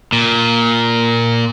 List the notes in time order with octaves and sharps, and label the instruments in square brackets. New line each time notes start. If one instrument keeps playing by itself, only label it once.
[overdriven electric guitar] A#2